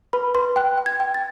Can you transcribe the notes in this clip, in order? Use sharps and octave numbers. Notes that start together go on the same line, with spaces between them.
B4 B5
B4 C6
G5 F#6
G5
G#6
G5
A6